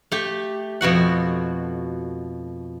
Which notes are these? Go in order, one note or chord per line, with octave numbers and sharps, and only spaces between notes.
A3 G4
F2 B2 F#4 F#5